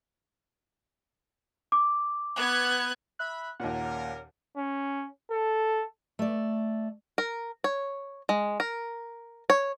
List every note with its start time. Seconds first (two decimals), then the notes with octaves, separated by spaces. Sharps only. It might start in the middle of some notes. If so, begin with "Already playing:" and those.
1.72 D6
2.39 B3 F#6 G#6
3.19 E5 B5 F#6
3.60 D#2 A#2 C#4 A#4 F#5
4.57 C#4
5.31 A4
6.19 A3 D5
7.18 A#4
7.64 C#5
8.29 G#3
8.60 A#4
9.50 C#5